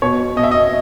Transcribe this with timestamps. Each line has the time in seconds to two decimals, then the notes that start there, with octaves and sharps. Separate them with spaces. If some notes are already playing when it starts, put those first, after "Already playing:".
0.02 B2 C#5
0.36 B2 D#5
0.43 E5
0.51 D#5